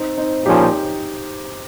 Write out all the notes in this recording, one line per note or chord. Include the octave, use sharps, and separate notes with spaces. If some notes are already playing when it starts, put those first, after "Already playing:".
Already playing: C4 D#4
C4 D#4
A#2 F3 G#3 C#4 D#4 G4